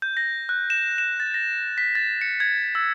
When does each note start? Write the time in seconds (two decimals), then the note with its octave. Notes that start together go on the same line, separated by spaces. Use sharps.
0.02 G6
0.17 A#6
0.49 F#6
0.70 E7
0.98 E7
1.20 A6
1.34 A#6
1.78 B6
1.95 A6
2.21 C#7
2.40 G#6
2.75 E6